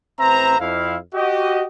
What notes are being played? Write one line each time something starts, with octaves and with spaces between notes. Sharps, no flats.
A1 C4 B4 C5 E5 A#5
F2 E4 F5
F#4 G4 D#5